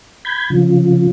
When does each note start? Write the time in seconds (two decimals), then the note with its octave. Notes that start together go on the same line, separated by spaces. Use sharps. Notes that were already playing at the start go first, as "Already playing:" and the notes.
0.25 B5 G6 G#6
0.50 C#3 F3